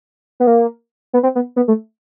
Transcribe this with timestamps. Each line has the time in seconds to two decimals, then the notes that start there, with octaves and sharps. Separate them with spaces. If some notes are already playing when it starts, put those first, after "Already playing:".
0.40 B3
0.47 A#3
1.13 B3
1.23 C4
1.35 B3
1.56 B3
1.68 A3